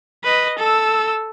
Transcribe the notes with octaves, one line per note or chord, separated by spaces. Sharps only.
B4 D#5
A4 E6